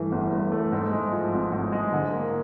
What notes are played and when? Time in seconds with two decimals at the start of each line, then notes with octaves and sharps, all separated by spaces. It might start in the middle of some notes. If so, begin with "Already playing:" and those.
Already playing: G2 E3 A3
0.12 G1
0.32 G2
0.52 A3
0.72 G#2
0.92 G#3
1.12 F3
1.33 G#1
1.52 G#2
1.72 G#3
1.93 D3
2.12 A#3